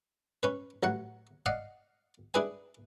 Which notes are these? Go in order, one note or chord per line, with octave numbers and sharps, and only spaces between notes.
C#4 B4
A1 F#3 F#5
D5 D#5 F5 F#5
D4 E4 G#4 B4 G#5